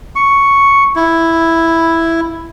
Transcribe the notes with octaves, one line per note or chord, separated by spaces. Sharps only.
C#6
E4